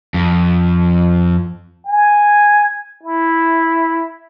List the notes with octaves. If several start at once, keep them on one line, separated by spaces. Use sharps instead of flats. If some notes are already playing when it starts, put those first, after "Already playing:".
F2
G#5
E4